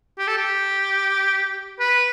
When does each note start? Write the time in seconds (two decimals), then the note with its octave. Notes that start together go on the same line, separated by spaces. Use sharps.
0.18 G4
0.28 A4
0.37 G4
1.80 B4